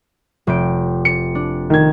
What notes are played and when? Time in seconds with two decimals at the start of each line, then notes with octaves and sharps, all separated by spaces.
0.47 F1 G5 D7
1.05 C#7
1.35 D4
1.70 D#3 G#6